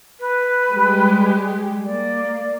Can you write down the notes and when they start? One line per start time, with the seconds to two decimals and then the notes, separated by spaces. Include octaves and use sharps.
0.20 B4
0.71 G3 G#3 G4
1.85 A#3 D5